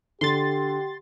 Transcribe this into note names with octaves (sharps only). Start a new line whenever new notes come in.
D3 G4 C6 A6